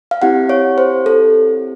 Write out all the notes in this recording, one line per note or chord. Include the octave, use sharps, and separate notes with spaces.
F5
C4 E4 G4 F#5
C#5
C5
A4